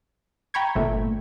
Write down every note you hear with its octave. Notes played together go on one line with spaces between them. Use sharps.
G5 A#5 B5 C#6 G#6
G1 A#2 A3